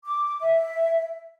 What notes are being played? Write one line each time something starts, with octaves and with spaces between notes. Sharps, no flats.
D6
E5